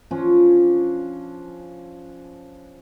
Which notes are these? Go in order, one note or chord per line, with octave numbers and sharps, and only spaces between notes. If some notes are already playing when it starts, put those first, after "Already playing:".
F3 C#4 D4